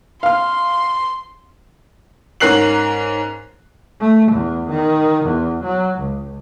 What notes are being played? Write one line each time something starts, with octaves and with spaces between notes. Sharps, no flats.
F5 C6 F6
G#2 C#4 A#4 F#6 C7 F#7
A3
E2
D#3
E2
F#3
C#2